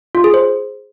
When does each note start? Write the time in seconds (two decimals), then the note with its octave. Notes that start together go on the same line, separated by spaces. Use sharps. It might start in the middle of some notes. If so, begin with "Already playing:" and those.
0.15 F4
0.24 G#4
0.34 C5